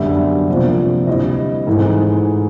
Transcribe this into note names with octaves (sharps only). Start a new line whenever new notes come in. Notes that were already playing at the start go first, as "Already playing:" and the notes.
Already playing: F#2 D3 G3 B3 D4 E5
C3 F3 A#3 D4 F4
D3 G3 C4 E4 D#5
G#2 E3 A3